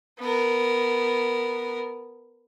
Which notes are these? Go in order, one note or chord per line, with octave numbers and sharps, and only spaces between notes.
B3 A#4